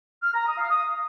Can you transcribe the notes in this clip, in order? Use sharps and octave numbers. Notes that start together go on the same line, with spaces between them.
F6
A#5
D#6
F5
D#6